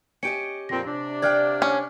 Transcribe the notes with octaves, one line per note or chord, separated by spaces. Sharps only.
C#4 G4 D#5 C#7 D7
F2 A#2 C4 A#6
C3 D4
D5 F5 G5 F6 F#6 G#6
C#4